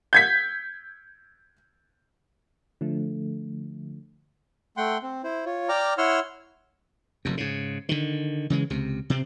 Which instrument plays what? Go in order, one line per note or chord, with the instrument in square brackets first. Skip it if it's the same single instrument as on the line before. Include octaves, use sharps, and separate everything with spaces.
[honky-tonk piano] G6 G#6 B6
[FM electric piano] D3 F3 A3
[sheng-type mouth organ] A3 F#5 G5 C6
C4
E4 C5
F4 C#5
D5 G5 A#5 D6 F6
E4 C#5 F#5 C6 E6 F6
[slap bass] F1 F#2
G#2 C#3
D3 D#3
C#3 E3 G#3
C#2 C3
C3 C4